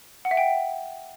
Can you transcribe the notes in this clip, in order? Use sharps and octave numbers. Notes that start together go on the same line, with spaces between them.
F#5
E5
G5